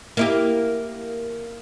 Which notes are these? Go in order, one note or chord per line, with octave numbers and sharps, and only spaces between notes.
A#3 E4 G4